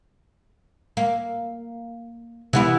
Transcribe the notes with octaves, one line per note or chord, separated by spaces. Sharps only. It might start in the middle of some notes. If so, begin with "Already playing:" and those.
A#3
C3 E3 B3 E4